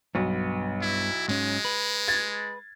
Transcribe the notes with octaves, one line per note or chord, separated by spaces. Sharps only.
B1 G2 B3
E4
G#2 G#3 C#4
B4
G#6 A6